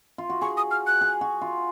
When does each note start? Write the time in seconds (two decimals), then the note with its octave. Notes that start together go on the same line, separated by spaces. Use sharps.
0.18 F4
0.30 F#4
0.41 G#4 C#6
0.57 D#6
0.71 F6
0.87 F#6
1.01 G#4
1.21 F#4
1.41 F4